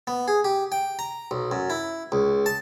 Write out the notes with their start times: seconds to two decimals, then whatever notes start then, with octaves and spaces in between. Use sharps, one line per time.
0.07 B3
0.28 G#4
0.44 G4
0.72 G5
0.99 A#5
1.31 B1
1.52 F#2
1.70 E4
2.12 C#2
2.46 A5